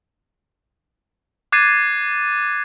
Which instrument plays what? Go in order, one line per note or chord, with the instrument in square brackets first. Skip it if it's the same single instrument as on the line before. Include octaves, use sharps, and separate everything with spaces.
[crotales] D6 F#6 G#6 A6 C7 D#7